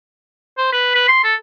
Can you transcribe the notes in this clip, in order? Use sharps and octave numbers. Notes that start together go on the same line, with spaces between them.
C5
B4
B4
C6
A4